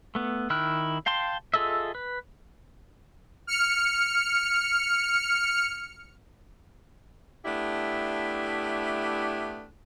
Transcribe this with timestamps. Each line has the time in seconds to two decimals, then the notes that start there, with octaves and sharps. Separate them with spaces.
0.15 A3 B3
0.50 D#3 E4 G5 F6 F#6
1.06 F5 G5 A5 C6
1.54 F4 G#4 A4 D#5 E5
1.95 B4
3.47 F6 C#7
7.45 A3 B3 D4 E4 G4